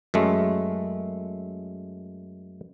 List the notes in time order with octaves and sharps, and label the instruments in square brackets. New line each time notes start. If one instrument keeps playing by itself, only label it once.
[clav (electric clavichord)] F#2 G#3 A3